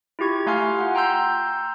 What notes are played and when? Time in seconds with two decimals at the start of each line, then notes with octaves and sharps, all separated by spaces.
0.19 E4 F4 G4 C#6 G#6
0.46 A3 F5 G#5 C6 F6
0.79 F4 F#5
0.95 G5 A#5 C6 E6 G6